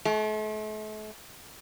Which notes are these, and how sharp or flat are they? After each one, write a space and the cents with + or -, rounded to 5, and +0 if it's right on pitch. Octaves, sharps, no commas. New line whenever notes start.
A3 -40